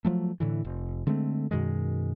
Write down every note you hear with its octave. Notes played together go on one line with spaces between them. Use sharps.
F3 F#3 A3
A2 D3 E3
F1
D3 G#3 A3 C4
F#2 B2 D#3 G#3